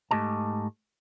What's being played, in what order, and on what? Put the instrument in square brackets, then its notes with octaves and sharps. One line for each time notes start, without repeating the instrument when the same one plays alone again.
[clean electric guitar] G#2 A3 G4 D#5 A5